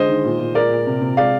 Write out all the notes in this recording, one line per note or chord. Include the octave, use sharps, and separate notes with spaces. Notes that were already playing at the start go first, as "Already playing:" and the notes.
Already playing: D3 G#3 C5 D#5
D#3
A#2
A#2
G#3 A#4 D5
A#2
C3
C3
G#3 D5 F5